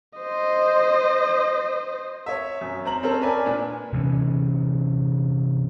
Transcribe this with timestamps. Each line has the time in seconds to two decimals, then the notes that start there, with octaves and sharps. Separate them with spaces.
0.19 C5 D#5
2.26 C#5 E5
2.61 F#2
2.85 C4 A#5 F#7
3.03 C4 C#4 A4 A#4 C#5
3.21 A#4 B4 D5 G#5 A5
3.46 A#2 D4
3.93 C3 E3 C#4